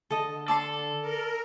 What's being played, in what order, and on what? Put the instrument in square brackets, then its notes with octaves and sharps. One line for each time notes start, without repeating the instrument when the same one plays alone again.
[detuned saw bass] D3 [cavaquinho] A4 D#5
[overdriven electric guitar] A4 [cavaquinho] D5 A5 C6
[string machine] A#4